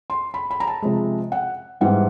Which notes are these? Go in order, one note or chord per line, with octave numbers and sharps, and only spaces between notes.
C6
B5
B5
A#5
A5
C3 F3 G#3
F#5
G#2 E3 G3 B3 F#5